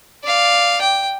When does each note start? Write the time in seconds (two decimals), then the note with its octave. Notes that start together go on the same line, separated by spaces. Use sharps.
0.24 D5 F5
0.81 G5